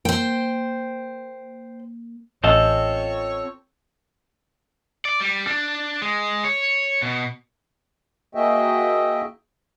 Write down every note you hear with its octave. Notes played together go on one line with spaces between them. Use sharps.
A#3 C5 G5
A1 C4 C#4 F4 A4 C#5 D#5 F5
D5
G3
D4
G#3
C#5
B2
A#3 F#4 G#4 D#5 E5 G5